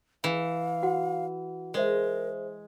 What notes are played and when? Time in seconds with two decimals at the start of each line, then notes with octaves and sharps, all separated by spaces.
0.24 E3 F5
0.83 F#4 F#5
1.74 G#3 G#4 A#4 C5 E5